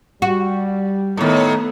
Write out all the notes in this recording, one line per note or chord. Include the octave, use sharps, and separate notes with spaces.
G3 F#4
A2 D#3 A3 B3